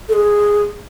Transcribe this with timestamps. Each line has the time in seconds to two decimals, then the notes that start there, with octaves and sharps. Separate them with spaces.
0.09 A4
0.13 G#4